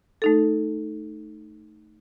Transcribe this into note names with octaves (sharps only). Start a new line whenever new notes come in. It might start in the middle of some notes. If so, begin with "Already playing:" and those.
A3 D#4 A4